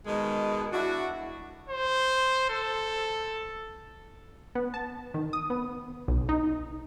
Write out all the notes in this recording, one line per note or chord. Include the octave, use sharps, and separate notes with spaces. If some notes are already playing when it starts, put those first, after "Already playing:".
B2 D#3 G#3
D4 E4 F#4
C5
A4
B3
A5
D#3
D#6
B3
B1
D#4